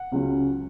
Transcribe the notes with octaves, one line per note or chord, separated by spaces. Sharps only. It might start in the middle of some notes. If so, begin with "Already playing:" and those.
Already playing: F#5
C#2 C#3 F#3 C#4